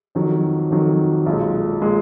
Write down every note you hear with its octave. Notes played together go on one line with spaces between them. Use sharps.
F2 D#3 F#3
F2 D#3 F#3
B1 A#2 G#3
A#2 G#3